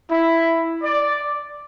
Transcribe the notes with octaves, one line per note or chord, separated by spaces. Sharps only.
E4
D5